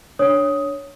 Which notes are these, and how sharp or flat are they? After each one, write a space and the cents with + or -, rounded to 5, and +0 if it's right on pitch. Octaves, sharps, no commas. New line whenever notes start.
D4 +0 C#5 +0 D#6 +10